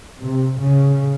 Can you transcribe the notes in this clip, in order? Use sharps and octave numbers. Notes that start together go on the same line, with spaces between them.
C3
C#3